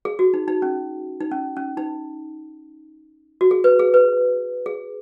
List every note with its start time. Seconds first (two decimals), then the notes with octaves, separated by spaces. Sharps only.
0.05 G#4
0.19 F#4
0.34 D#4
0.48 D#4
0.62 C#4
1.21 D#4
1.31 C#4
1.57 C#4
1.77 D#4
3.41 F#4
3.51 G#4
3.64 B4
3.79 G#4
3.94 B4
4.66 G#4